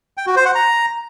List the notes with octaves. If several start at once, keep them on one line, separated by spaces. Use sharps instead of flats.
G5
F#4
C5
F#5
A#5